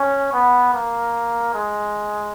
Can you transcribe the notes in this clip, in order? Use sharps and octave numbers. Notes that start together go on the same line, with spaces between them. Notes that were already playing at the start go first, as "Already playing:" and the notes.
Already playing: C#4
B3
A#3
G#3